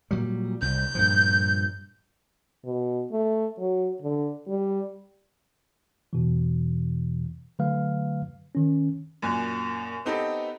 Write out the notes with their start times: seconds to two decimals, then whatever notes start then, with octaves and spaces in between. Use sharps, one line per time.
0.11 A#2 F#3 G3
0.62 C2 G6
0.95 G2 A#2 F3
2.64 B2
3.12 A3
3.59 F#3
4.02 D3
4.48 G3
6.13 E2 B2 E3
7.59 D3 F#3 A3 B4 F5 F6
8.55 D#3 C#4
9.22 F#2 A#2 G#5 F#6
10.05 B3 C4 D#4 G4 A4 B4